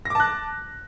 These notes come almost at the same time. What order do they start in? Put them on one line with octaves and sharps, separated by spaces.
A#6 D6 A5 F#6